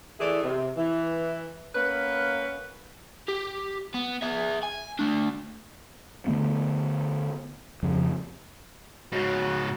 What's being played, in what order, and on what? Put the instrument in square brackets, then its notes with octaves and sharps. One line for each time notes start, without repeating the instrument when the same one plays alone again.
[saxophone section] E3 A3 E4 G#4 D5
C3
E3
A#3 B3 C#4 B4
[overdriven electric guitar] G4
B3
G#4 E5
G#5
A3 D4
[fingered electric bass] D3 E3 A3 B3
F2 C#3 F3
[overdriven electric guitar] G#2 C#3 [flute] F#4